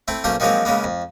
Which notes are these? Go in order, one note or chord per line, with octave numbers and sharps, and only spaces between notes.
A3 C4 E4
B1 A3 A#3 C#4 C5
D#3 F3 F#3 G#3 A#3 C4
C#3 G#3 A#3 B3
F2